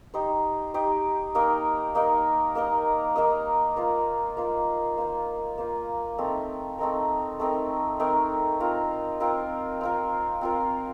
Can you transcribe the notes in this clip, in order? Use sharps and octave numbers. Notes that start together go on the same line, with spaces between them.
D#4 G4 C5
D#4 G4 C5
A#3 D#4 A#4 D#5
A#3 D#4 A#4 D#5
A#3 D#4 A#4 D#5
A#3 D#4 A#4 D#5
A#3 F4 C5
A#3 F4 C5
A#3 F4 C5
A#3 F4 C5
A3 C4 D#4 A#4
A3 C4 D#4 A#4
A3 C4 D#4 A#4
A3 C4 D#4 A#4
C4 F4 A#4
C4 F4 A#4
C4 F4 A#4
C4 F4 A#4